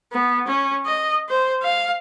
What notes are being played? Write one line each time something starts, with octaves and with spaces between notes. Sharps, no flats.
B3
C#4
D#5
C5
F5